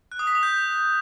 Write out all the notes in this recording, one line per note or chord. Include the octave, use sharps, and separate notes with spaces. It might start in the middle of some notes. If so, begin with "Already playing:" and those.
F#6
D#6
B6
D#6
G6